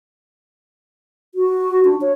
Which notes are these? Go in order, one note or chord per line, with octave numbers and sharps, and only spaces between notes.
F#4
D4
C#5